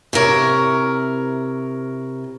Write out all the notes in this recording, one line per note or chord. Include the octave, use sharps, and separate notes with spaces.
C3 E4 A#4 C#5